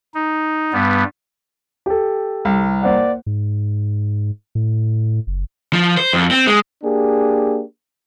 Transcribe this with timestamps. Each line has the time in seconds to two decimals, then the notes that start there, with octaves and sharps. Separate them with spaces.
0.14 D#4
0.73 G2 G3 B3
1.86 G4 A4
2.45 C2
2.83 A#3 C5 D5 F#5
3.26 G#2
4.55 A2
5.27 F#1
5.73 F3
5.97 C5
6.13 F2
6.31 C4
6.47 G#3
6.83 A#3 D4 G4 G#4